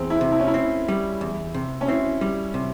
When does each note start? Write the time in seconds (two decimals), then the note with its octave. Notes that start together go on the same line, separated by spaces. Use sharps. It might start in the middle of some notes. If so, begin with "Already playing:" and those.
Already playing: E2 C4
0.10 E4
0.21 C3
0.32 E4
0.39 C#4
0.47 E4
0.54 C4
0.88 G3
1.21 E2
1.54 C3
1.81 C#4
1.88 C4 E4
2.21 G3
2.54 C3